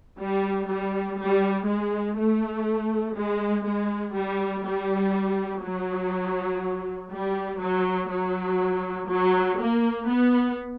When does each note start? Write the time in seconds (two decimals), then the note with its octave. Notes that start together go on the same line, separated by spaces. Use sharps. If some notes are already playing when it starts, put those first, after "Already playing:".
0.19 G3
0.68 G3
1.18 G3
1.67 G#3
2.17 A3
3.16 G#3
3.65 G#3
4.13 G3
4.64 G3
5.62 F#3
7.10 G3
7.59 F#3
8.09 F#3
9.08 F#3
9.58 A#3
10.07 B3